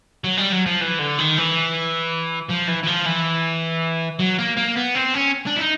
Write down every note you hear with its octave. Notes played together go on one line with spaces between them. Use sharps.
F#3
G3
F#3
F3
E3
D3
D#3
E3
F3
E3
E3
F3
E3
F#3
A#3
A#3
B3
C4
C#4
D4
E4
D#4